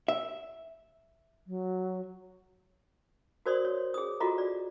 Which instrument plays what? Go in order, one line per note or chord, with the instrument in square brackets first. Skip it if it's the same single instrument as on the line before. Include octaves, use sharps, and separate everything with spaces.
[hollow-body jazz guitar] E5
[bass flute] F#3
[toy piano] F#4 A#4 C5 D5 C6 D#6
C#5
G#4 D#6
F4 F#4 A4 D#5 A#5
D5